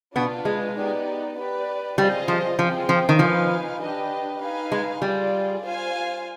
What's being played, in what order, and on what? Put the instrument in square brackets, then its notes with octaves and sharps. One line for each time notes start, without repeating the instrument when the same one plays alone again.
[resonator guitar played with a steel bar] B2 B3 [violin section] D4 F4 B4
[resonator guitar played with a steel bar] G#3
[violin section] B3 D#4 G4 D5
G4 B4 D5
[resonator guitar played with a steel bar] G3 [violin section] C4 F4 G#4 C5 D#5
[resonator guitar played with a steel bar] F3
[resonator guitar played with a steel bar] F3 [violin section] C4 F4 G#4 C5 G5
[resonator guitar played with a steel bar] F3
D#3
[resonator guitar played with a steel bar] F3 [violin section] D#4 B4 F5 G#5
[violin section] D4 G4 B4 D#5
D#4 B4 F5 G#5
[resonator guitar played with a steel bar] G#3
[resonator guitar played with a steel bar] G3 [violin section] F4 G#4 D5
[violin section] F4 C5 F5 G#5